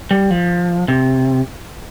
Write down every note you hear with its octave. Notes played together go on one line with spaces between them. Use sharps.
G3
F3
C3